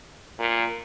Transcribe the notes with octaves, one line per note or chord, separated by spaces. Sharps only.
A#2